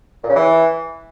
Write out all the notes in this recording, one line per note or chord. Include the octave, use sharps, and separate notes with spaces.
A#2
C#3
E3